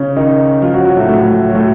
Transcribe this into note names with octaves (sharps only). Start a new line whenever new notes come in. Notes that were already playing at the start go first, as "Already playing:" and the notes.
Already playing: C#3 C#4
D#3 D#4
F3 F4
F#3 F#4
F#3 F#4
A2 A3
A2 A3
F#3
A2 A3